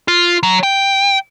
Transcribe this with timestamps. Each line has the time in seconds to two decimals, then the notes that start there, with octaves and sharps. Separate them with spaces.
0.08 F4
0.43 F#3
0.63 G5